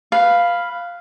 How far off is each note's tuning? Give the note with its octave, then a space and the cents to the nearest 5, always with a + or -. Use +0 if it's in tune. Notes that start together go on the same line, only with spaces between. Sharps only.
B4 +0 F5 +0